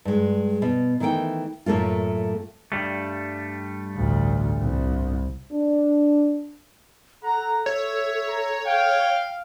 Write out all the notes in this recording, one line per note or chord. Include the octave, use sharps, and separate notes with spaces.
G2 G#3
B2
D#3 E3 A3 F#5 G5
F#2 A2 A3 A#3 F4
G2 G3 A3
A1 D2
C2
D4
A4 F#5 A#5
C#5 E5
A#5
F5 G5